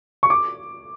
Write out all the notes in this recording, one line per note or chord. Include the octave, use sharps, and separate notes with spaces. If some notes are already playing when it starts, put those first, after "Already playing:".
C#6
D6